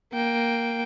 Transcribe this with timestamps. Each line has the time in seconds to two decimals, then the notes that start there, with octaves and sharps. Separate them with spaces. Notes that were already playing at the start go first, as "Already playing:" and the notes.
0.13 A#3 G5